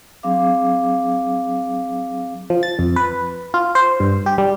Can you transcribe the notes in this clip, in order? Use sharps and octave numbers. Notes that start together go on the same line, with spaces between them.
F#3 C4 D4 G#4 F5 D6
F3
A6
F2
B4
F4
C5
G2
G4
G3